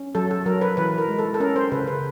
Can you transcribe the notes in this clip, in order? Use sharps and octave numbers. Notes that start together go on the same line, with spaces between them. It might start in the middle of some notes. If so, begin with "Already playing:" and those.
Already playing: C#4
F#3 A4
A4
F#3 A#4
B4
E3 B4
A#4
G#3
A4
A4
C#4 A#4
C5
C#3 B4
B4